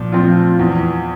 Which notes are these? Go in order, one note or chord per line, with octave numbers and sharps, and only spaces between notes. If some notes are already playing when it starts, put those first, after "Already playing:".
Already playing: A#2 F3
F3 C4 F4
E2